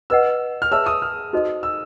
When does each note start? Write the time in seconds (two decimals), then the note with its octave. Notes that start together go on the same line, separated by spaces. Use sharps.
0.10 B4 D#5 F#5 E6
0.62 F6
0.71 G#4 C#5 E5 A5 E6
0.86 D#6
1.02 F6
1.33 D#4 F#4 A4 C5 D#5
1.63 E6